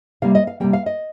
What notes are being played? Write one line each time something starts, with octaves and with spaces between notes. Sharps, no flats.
C3 G3 A#3 F5
D#5
F5
C3 G3 A#3 G5
F5
D#5